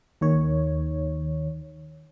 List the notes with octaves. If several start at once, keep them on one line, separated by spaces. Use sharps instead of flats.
D#2 D#3 C#5